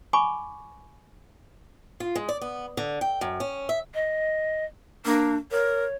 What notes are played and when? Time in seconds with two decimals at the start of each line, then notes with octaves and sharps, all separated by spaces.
0.13 G#5 B5 C#6 D6
2.00 F4
2.16 G#3
2.29 D5
2.41 B3
2.77 D3
3.01 G5
3.21 F#2
3.40 C#4
3.69 E5
3.95 D#5
5.05 A#3 D4
5.51 A#4 C#5